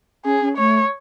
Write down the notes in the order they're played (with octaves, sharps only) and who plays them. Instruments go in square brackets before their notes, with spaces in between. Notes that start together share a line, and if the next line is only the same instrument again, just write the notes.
[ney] C#4 [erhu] G#4
[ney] C#4
[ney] A3 [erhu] C#5